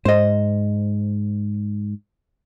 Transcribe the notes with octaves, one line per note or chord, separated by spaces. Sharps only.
G#2 C5 D#5